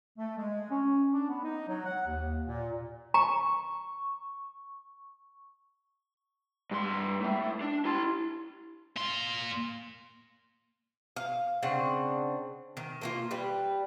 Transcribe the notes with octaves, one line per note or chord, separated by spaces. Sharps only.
A3
G#3
C#4
D4
B3
D#4
F#3
F#5
D#2
A#2
A#5 C#6
G2 C6
A2 A3
D4
E4 C6
A#3 C6
F5
C#3 C4 D4 F#5
D#3
A3 A#3 F4
G3 B4